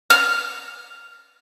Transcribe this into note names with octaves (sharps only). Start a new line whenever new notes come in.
F6